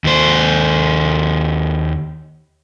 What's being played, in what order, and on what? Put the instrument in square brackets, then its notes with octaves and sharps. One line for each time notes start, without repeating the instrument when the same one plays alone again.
[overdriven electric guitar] D#2 C5